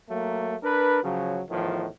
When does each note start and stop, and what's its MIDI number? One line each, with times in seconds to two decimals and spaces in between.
0.10 0.55 54
0.10 0.55 57
0.10 0.55 58
0.63 1.00 62
0.63 1.00 70
0.63 1.00 71
1.03 1.41 49
1.03 1.41 53
1.03 1.41 54
1.50 1.87 40
1.50 1.87 45
1.50 1.87 51
1.50 1.87 53